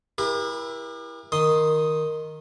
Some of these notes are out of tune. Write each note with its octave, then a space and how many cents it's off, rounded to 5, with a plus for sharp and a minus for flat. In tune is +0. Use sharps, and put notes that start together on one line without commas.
E4 +10 G4 +40 A#4 +40
D#3 +0 C6 +0 D#6 +0